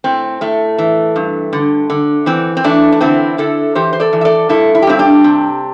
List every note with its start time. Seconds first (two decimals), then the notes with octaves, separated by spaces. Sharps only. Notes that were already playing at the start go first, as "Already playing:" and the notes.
0.04 A2 C4
0.41 A2 A3
0.78 E3
1.16 G2
1.53 D3
1.90 D3
2.26 E3 C4
2.57 C4
2.64 E3 A3 D4
2.92 D4
3.01 D3 C4 E4
3.38 D3 E4 A4
3.75 E3 G4 C5
3.93 C5
4.00 A4 D5
4.13 E3
4.21 E5
4.25 A4 D5
4.49 G2 E4 A4
4.75 E4
4.82 G4
4.87 G2 C4 E4
4.99 D4 G4
5.24 C3